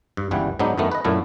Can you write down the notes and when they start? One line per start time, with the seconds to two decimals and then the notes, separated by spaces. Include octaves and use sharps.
0.17 G2
0.31 G1 C#2 E3 G3 F#5
0.59 G#2 F#3 B3 D4 D#4
0.78 F#2 D#3 A3 B3
0.92 B4 D#5
1.05 F#2 A#2 F#3 A3 E4